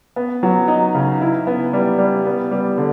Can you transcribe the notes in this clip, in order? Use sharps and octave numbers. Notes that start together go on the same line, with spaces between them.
B3
F#3
D#4
C#3
E4
B3
G3
G3
B3
G3
D3